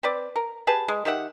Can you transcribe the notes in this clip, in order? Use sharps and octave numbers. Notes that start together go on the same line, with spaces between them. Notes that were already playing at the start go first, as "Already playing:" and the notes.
C4 B4 D5
A#4
G4 G#4 B4 A5
G#3
D#3 G4 E5 F#5